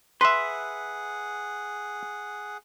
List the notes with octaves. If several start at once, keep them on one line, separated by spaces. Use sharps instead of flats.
G#4 B4 E5 F#5 C6